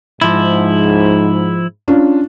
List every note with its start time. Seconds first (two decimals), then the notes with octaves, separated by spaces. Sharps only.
0.21 G#2 F3 E4
1.88 C#4 D4 F4